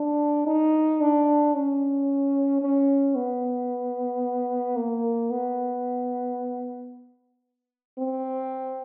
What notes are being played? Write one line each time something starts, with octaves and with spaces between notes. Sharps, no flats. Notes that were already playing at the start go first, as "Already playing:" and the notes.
Already playing: D4
D#4
D4
C#4
C#4
B3
A#3
B3
C4